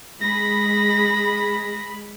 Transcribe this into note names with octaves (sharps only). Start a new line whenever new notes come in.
G#3 B5 A#6